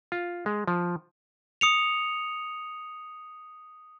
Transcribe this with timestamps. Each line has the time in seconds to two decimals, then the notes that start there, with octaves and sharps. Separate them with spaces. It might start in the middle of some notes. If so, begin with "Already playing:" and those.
0.12 F4
0.46 G#3
0.68 F3
1.61 D#6 C#7 F7